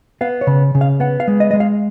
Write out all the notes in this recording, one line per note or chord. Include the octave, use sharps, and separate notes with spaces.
B3 F5
C#5
C#3
C#3
F5
B3 F#5
F5
G#3
D#5
G#3 D#5
F5